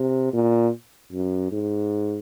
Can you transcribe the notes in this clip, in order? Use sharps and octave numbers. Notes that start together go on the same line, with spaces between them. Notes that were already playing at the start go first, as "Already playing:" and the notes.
Already playing: C3
A#2
F#2
G#2